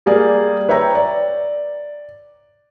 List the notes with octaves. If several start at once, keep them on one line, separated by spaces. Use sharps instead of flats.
G3 A#3 G#4 D5
B4 C#5 E5 G5 A#5
D5